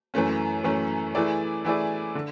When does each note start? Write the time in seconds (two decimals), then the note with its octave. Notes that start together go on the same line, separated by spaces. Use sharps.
0.14 F#2 E3 A3 C#4
0.64 F#2 E3 A3 C#4
1.15 E3 A3 E4 G#4 D5
1.65 E3 A3 E4 G#4 D5
2.15 D3